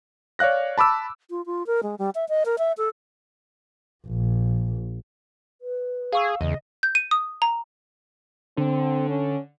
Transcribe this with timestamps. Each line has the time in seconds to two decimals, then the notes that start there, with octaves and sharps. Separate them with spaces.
0.39 C#5 D5 F5 F#6 A#6
0.78 A5 B5 D6 E6
1.30 F4
1.46 F4
1.67 A#4
1.83 G#3
1.99 G3
2.15 E5
2.29 D#5
2.45 A#4
2.59 E5
2.78 A4
4.06 A#1
5.61 B4
6.12 G#4 F5 C#6 E6
6.41 E2 C#3 D#5
6.83 G6
6.95 D#7
7.11 D#6
7.42 A#5
8.57 D3 C4
9.09 C#4